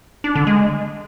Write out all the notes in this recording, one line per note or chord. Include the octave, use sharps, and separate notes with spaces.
D4
D3
G#3